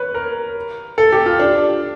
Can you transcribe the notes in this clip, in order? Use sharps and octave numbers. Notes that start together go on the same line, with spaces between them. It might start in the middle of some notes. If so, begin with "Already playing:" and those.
Already playing: B4 C#5
A#4
A4
G4
F4
D4